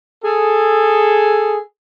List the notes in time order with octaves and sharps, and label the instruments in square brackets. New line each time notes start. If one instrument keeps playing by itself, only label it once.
[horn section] G#4 A4